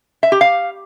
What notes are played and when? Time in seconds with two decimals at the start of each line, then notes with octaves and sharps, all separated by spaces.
0.23 E5
0.32 G4
0.41 F5